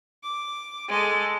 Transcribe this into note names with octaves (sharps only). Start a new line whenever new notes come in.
D6
G#3 A4